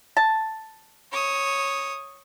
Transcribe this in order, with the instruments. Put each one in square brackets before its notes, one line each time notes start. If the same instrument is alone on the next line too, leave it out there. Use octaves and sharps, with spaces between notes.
[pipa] A5
[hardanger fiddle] C#5 D#6